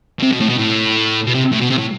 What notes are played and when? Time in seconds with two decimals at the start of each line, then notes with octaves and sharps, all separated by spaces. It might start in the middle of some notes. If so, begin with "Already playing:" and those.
0.20 B2
0.23 C3
0.32 B2
0.41 A2
0.50 B2
0.58 A2
1.27 B2
1.35 C3
1.52 A2
1.61 B2
1.71 C3
1.78 A2